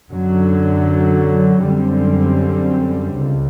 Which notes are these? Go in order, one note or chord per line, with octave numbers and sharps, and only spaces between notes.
F#2 D3 F#3
F#2 D3 G3 C4
C#2